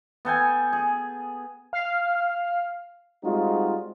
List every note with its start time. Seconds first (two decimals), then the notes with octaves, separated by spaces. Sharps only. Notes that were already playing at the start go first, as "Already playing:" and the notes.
0.25 B3 A4 G5 G#5
0.73 G#4
1.73 F5
3.23 G3 G#3 C4 D#4 F4 F#4